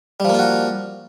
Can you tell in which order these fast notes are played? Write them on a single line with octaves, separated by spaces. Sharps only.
G3 F3 A#3 F4 F#4